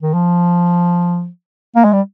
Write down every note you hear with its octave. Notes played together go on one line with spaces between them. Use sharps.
D#3
F3
A#3
G#3
G3